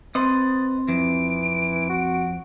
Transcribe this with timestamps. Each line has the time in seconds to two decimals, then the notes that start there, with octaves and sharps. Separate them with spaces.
0.15 C4 B4 C5 D#5 C6 A6
0.88 F2 E3 D7
1.89 F#4